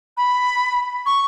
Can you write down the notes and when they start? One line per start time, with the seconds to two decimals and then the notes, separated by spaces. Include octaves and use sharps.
0.17 B5
1.06 C#6